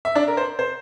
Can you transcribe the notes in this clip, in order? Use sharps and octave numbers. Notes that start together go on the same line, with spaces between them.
E5
D4 D5
A#4
C5
C5